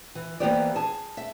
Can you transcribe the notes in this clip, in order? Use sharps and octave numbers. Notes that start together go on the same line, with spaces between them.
E3
E3 A#3 B3 G4 C5 D5
G#4 A5
E5